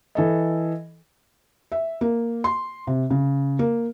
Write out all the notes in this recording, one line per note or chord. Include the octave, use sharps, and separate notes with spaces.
E3 A4 D#5
E5
A#3
C6
C3
C#3
A#3